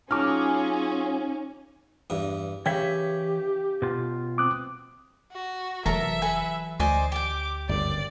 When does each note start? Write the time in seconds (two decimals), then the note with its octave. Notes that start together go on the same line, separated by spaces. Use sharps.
0.11 F#3 C#4 D#4 F4 G#4 A5 D6 F6
2.10 E2 G2
2.66 C#3 E3 G4 C#5 E5 G5
3.82 B2 F4
4.38 C4 D6 D#6 F#6
5.32 F#4
5.86 F1 E3 F#3 A4 A#4 E5 A#5
6.22 A4 B4 G#5
6.80 D2 C5 D5 D#5 G#5
7.12 G4 G5 D6
7.69 G1 F#2 C#3 D5